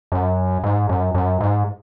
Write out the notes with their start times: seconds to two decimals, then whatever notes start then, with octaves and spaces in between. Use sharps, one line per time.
0.12 F#2
0.64 G#2
0.89 F#2
1.15 F#2
1.40 G#2